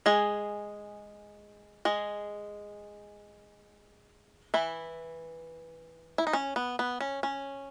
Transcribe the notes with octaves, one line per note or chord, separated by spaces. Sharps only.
G#3 G#4
G#3 G#4
E3 E4
E4
D#4
C#4
B3
B3
C#4
C#4